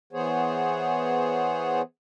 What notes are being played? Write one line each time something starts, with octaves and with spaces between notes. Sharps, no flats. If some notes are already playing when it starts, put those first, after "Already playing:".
E3 B3 G#4 C5 C#5